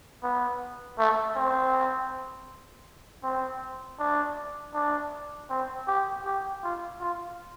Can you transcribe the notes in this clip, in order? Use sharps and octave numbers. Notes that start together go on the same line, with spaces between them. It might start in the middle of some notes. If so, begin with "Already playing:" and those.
B3
A3
C4
C4
D4
D4
C4
G4
G4
F4
F4